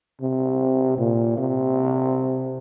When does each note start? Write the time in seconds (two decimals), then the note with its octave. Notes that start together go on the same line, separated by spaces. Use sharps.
0.21 C3
0.98 A#2
1.37 C3